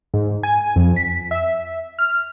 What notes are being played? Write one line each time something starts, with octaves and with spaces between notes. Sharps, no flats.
G#2
G#5
F2
B6
E5
F6